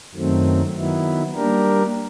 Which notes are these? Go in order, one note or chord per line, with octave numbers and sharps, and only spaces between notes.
F#2 D#3 F#3 A3 C4
D#3 F#3 B3 E4
G3 A#3 D4 G4 A#4